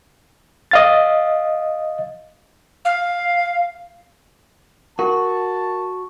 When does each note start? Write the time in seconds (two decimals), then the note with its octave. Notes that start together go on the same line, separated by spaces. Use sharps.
0.71 D#5 F5 A6
2.85 F5
4.99 F#4 A#4 A5